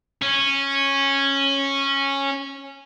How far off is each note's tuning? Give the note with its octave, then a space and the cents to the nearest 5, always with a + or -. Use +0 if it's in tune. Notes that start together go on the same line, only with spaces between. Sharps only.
C#4 -10